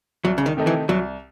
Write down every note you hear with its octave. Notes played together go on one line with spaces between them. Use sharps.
C2 F#3
C#3
D#3
C3 D#3 A3 D#4
E3
C2 F#3